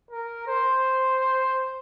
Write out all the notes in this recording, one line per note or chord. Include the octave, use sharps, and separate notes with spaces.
A#4
C5